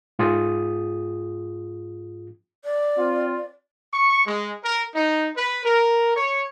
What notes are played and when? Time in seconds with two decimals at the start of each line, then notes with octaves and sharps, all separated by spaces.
0.19 G#2 F4 G#4 D#6
2.65 D5
2.97 C4 F4
3.93 C#6
4.27 G#3
4.64 A#4
4.95 D#4
5.37 B4
5.65 A#4
6.17 C#5